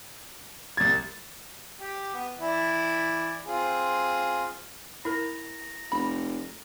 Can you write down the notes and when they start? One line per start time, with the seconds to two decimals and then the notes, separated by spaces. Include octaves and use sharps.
0.77 C2 G#6 A6
1.80 G4
2.14 B3
2.38 E3 E4 D5
3.46 C4 F4 G#4
5.05 E4 A#4 A#5
5.92 F1 B5